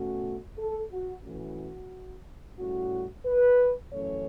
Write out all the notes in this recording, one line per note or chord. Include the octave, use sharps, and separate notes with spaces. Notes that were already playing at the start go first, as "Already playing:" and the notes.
Already playing: B2 A3 C#4 F#4
A4
F#4
A2 E3 A3 C#4 F#4
A2 G3 C#4 F#4
B4
F#2 E3 A3 C#4 C#5